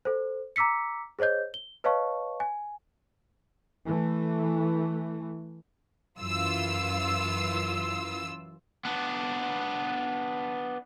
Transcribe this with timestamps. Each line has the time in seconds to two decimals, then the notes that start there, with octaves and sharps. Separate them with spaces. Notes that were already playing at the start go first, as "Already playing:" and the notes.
0.05 A4 C5
0.56 A#5 D6 E6 B6 C#7
1.19 G#4 C5 C#5 D#5 G6
1.54 G7
1.84 B4 C#5 D#5 F5 A5 C#6
2.40 G#5
3.86 E3 A3
6.19 F#2 E3 F4 E6
8.85 B3 D4